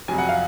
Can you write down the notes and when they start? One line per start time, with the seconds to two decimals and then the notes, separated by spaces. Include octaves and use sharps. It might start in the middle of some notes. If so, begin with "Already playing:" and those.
0.08 F2 C3 F#3 G#5
0.18 F#5
0.29 F5